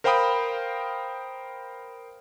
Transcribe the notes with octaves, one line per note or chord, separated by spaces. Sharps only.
A#4 C5 F5 G5 B5 D#6